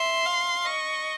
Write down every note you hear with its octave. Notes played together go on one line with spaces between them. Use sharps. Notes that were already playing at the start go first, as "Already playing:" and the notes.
Already playing: E5 C6
F5
D#5 C#6